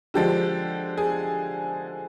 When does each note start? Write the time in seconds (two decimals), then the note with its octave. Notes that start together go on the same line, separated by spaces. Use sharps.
0.14 D3 F3 G#3 G4
0.97 G#4